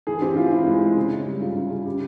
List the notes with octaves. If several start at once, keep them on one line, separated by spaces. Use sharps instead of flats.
E3 G#4
C4 G4
E3 F4
G#3 E4
G#3
G#3
C#3
C#3
G3
C#3 F4
C#3
C#3
C#3 G4